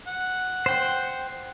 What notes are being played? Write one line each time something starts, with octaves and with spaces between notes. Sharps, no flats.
F#5
C5 G5